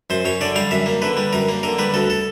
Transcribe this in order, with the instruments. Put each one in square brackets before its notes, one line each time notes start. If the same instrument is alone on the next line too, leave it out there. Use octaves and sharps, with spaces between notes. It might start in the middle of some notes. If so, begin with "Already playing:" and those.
[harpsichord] F#2 C5
F#2 C#5
D3 D5
G3 F5
F#2 E5
A#3
D3 B4
G3
F#2 A#4
A#3
D3 A#4
G3 B4
D2 A4
A4